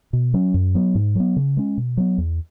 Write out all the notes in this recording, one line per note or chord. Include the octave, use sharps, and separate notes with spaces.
B2
F#3 C#4
F#2
F#3 B3
G#2
F#3 B3
C#3
G#3 C#4
B2
F#3 B3
E2